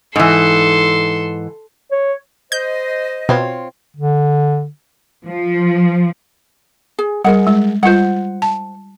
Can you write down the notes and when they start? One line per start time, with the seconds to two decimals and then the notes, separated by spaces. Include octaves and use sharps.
0.16 G#2 E3 A4 C6
1.92 C#5
2.52 C5 D#5 G6
3.29 B2 C4 F4 C#5
3.97 D3
5.24 F3
6.99 G#4
7.25 G3 G#4 A#4 F#5
7.47 G#3
7.83 G3 F4 C5 F#5
8.42 A5